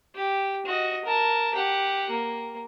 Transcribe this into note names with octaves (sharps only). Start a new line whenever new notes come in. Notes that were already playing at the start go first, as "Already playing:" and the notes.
G4
F#4 D#5
A#4 A5
G4 F#5
A#3